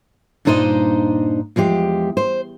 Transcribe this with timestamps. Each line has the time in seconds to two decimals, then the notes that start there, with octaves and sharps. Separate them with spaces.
0.45 G2 A#2 D4 D#4 C5 D#5
1.56 E2 F3 G#3 G4
2.17 C5